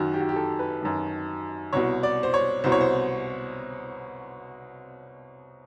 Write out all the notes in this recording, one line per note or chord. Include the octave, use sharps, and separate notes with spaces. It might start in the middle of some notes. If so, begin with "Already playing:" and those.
Already playing: F#2 D#3 F#4
G4
F#4
G4
A4
B4
F#2 D#3
C2 B2 C#5
D5
C5
C#5
C2 B2 C5
C#5
C5